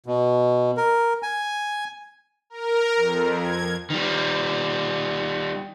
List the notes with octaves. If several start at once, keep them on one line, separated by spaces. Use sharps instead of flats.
B2
A#4
G#5
A#4
F2
G#6
D#3 G3